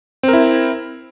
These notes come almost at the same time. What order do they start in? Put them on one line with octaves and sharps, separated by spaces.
C4 A#4 E4